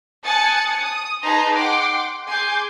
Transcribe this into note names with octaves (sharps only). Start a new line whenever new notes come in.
G#5 A5 D#6 F#6 A6 C#7
D#6
D#4 G#4 B4 A5 A#5 C6
F#5 G5 C6 D6
G#4 G#5 C6 D6 G6